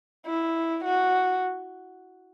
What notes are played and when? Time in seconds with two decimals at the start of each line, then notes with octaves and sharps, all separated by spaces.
0.26 E4
0.84 F#4